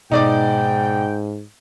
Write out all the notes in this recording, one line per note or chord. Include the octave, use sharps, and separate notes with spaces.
G#2 B2 D#4 D5 G5 D6